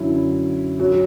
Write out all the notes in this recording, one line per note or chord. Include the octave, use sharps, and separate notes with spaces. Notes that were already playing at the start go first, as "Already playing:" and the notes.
Already playing: F#2 D3 F#3 E4
F#3 F#4